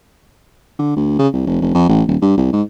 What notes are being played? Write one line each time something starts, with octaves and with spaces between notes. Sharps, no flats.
D3
D2
C#3
C2
F1
F1
F2
A1
D#1
G2
C2
G#2